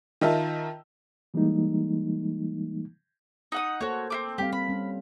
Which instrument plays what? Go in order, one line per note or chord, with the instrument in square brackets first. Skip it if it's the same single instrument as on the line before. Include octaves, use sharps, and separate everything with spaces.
[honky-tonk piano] D#3 D#4 F4 E5 A5
[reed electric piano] E3 G3 G#3 A#3 D#4
[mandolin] D#4 F#5 D#6
[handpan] A#3 A4 C5 [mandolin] F#4 C#5
[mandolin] C4 E4 D6
[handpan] G3 C4 F5 [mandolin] G4
[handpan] C4 [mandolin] B5
[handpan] G3 C#4